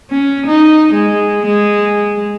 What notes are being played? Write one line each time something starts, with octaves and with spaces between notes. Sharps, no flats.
C#4
D#4
G#3
G#3